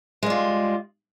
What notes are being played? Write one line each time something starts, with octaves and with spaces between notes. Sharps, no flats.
G3 G#3 F4